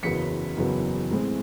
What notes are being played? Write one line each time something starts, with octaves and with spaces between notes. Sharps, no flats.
F#1 E2 C#3 F#3 B3 B6 C#7
F#1 E2 C#3 F#3 B3
A2 E3 G#3 C4